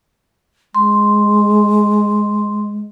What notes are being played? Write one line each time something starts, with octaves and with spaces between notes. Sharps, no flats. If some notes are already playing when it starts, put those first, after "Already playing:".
G#3 C6